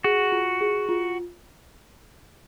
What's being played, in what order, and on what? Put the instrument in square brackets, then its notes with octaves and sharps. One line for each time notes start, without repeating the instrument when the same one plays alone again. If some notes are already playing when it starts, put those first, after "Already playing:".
[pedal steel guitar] F#4 [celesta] G#4
[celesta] F4
G#4
F4